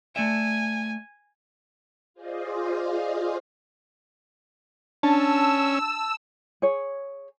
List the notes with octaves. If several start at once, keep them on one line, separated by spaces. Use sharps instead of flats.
A3 D5 E5 G#5
F4 G#4 C5 D5 D#5 F5
C#4 D4 A5 E6
G#4 C#5